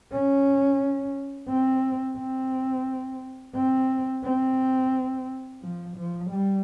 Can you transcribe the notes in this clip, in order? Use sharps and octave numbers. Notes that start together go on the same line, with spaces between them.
C#4
C4
C4
C4
C4
F3
F3
G3